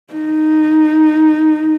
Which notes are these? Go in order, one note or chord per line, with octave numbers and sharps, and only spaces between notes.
D#4